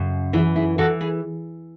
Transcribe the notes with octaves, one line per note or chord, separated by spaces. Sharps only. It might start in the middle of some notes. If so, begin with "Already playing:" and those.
Already playing: F#2 C#3
E3 E4 G#4
E4 G#4
E3 F#4 A4
G#4 B4